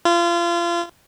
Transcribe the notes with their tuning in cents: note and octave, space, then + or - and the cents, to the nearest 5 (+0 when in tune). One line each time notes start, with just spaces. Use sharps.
F4 -30